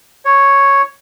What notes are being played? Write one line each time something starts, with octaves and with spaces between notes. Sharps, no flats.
C#5